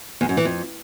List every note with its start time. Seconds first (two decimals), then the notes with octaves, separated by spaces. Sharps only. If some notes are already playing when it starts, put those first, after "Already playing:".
0.21 E2
0.29 F#2
0.37 E3
0.45 F2